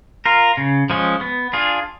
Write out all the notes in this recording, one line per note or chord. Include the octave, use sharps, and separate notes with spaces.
F4 A#4
C#3
F3 G#3 C#4
B3
D4 F4 G#4